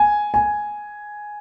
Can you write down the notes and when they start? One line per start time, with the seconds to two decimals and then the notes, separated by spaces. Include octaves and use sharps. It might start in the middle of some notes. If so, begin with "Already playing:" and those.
Already playing: G#5
0.34 G#5